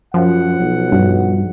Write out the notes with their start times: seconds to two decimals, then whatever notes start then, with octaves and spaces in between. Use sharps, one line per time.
0.14 F#2 F3 F#5
0.60 B1
0.92 G2